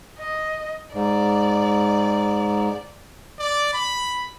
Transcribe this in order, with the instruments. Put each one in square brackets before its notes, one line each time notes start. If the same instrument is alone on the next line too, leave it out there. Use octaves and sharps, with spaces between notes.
[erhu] D#5
[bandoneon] G#2 [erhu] D5
[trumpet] D5
B5